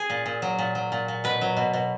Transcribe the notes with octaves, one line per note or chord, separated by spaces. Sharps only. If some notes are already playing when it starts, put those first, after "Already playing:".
Already playing: G#4
A#2
A#2
F#3
A#2
F#3
A#2
A#2
B2 B4
F#3
B2
B2